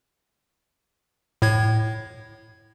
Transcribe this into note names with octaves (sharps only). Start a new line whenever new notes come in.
A2 G#6